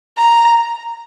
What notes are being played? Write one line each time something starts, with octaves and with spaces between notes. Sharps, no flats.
A#5